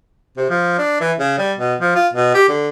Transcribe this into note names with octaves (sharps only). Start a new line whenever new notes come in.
C3
F3
D4
E3
C#3
G3
B2
F3
F4
B2
G4
D3